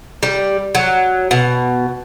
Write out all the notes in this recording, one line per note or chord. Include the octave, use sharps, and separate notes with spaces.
G3
F#3
B2